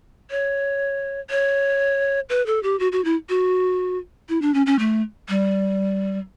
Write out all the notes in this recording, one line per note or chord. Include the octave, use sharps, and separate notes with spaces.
C#5
C#5
B4
A4
G4
F#4
F#4
E4
F#4
E4
D4
C#4
C#4
A3
G3